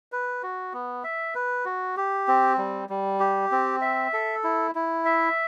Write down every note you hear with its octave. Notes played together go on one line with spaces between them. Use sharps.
B4
F#4
B3
E5
B4
F#4
G4
C4
G3
G3
G4
C4
E5
A4
E4
E4
E5